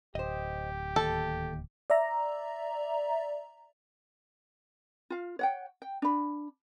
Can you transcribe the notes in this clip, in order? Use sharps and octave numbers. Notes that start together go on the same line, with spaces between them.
D1 G4 C5 D#5
D#2 A4
D5 E5 A#5
F4 F5
C#5 F#5 G5
G5
D4 B5